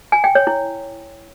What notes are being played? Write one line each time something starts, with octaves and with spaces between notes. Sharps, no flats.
G#5
G5
C#5
E4